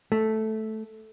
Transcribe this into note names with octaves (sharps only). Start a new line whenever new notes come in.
A3